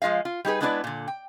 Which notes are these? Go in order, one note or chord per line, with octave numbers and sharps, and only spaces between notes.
F3 G#3 F4 D#5 F5
F4
G3 D#4 G#4 B4
G#3 B3 D4 E4 B4 D5
A#2 D3
G5